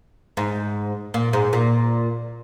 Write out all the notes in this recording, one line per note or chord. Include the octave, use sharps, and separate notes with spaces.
G#2
A#2
G#2
A#2